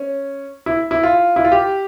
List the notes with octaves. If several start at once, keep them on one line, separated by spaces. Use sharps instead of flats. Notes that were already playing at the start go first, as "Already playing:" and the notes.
Already playing: C#4
E4
E4
F4
E4
F4
G4